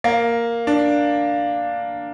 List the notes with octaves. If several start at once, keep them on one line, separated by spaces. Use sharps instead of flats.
A#3
D4